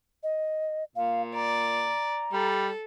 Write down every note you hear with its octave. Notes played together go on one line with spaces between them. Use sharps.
D#5
A#2 F5
D5 A#5
G3 A4